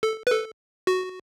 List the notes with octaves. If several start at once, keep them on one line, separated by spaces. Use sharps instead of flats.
A4
B4
A4
F#4